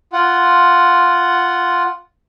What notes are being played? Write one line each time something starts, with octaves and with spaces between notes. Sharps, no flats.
F4 F#5